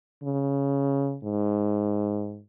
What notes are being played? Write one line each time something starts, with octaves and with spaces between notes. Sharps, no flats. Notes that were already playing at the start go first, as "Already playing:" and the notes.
C#3
G#2